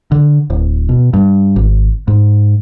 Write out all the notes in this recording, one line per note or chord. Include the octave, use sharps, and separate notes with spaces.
D3
D1
B2
G2
G#1
G#2